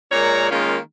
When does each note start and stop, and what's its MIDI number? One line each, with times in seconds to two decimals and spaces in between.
0.12 0.49 46
0.12 0.49 56
0.12 0.49 70
0.12 0.49 73
0.12 0.49 74
0.12 0.49 82
0.51 0.77 51
0.51 0.77 56
0.51 0.77 58
0.51 0.77 61
0.51 0.77 65